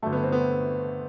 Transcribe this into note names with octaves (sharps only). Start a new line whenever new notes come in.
G1 G2 F#3 A3
B3
C4
B3